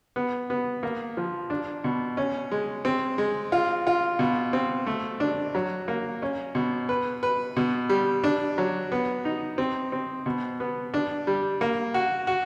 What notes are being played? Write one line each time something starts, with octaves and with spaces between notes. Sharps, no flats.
B3
B3
A#3
F3
D4
B2
C#4
G#3
C4
G#3
F4
F4
B2
C4
A3
D4
F#3
A#3
C#4
B2
B4
B4
B2
G3
D4
F#3
B3
D#4
C4
C4
B2
B3
D4
G3
A#3
F#4
F#4